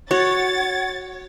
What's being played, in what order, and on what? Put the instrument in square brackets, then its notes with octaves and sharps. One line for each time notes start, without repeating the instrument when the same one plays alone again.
[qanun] F#4 [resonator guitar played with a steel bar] C#5 [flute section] F#5 G#6 [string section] A6